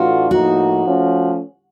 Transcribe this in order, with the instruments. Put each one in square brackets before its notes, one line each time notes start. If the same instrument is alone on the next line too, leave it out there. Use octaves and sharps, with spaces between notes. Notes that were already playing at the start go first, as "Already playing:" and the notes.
Already playing: [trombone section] A2 E3 A3 D4 F4 [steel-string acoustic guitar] F#4
[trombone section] A2 F3 A#3 D#4 [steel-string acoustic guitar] F#4
[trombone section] F3 A3 C#4